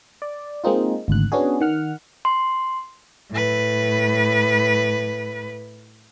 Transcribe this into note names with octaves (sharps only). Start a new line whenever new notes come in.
D5
G#3 A#3 C4 D#4 F4
G#1 D2 F#6
B3 C#4 D4 F#4 G#4
D#3 F#5 F6
C6
A2 B4